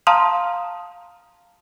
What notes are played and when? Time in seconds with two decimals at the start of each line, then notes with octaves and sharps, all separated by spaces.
0.07 F5 A5 A#5 C6 D#6 F6